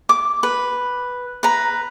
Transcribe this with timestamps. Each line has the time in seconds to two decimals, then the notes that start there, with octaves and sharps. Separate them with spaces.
0.09 D6
0.43 B4
1.43 B4 A#5